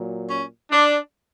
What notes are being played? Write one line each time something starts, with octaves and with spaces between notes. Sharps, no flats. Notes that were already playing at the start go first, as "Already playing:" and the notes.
Already playing: A#2 F#3
C#4
D4